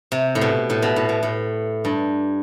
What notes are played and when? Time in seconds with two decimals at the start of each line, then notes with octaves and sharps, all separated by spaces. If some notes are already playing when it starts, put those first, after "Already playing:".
0.12 C3
0.35 A2
0.41 B2
0.70 A2
0.82 B2
0.96 A2
1.09 B2
1.23 A2
1.85 G2